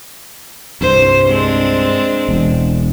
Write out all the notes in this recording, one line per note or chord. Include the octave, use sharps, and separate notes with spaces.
C2 G2 C5
G#3 C4 D4
E1